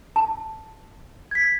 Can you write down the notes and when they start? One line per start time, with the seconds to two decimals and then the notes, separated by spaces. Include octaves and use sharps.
0.16 A5
1.31 G#6 B6